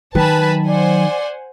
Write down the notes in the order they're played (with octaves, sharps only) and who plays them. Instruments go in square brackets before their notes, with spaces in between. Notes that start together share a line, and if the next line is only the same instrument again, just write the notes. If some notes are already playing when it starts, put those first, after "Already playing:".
[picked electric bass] D#3 [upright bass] F#3 [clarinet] B4 [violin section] G#5 A5 B5
[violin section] C5 F#5 G#5 [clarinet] D5